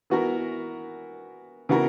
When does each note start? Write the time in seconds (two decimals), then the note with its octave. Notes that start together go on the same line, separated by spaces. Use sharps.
0.10 E3 B3 F#4 A#4
1.69 C#3 E3 B3 F#4 A#4